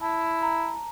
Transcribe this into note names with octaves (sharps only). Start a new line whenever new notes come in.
E4 A5
A#5